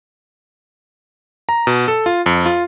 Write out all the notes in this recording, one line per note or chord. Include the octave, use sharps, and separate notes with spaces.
A#5
B2
A4
F4
F2
F4